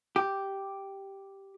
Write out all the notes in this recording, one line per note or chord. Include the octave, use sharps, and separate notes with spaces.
G4